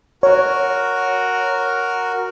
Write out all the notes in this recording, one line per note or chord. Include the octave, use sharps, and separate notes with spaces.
F#4 A#4 C#5